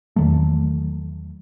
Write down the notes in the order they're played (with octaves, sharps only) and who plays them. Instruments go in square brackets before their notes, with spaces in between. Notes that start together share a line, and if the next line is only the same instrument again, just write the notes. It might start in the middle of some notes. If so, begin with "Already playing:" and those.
[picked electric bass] E2 D#3 F#3 A3